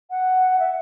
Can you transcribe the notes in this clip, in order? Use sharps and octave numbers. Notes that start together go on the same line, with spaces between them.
F#5
E5